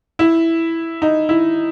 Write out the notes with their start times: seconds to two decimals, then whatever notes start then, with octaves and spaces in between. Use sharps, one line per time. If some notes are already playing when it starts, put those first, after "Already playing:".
0.19 E4
1.02 D#4
1.29 E4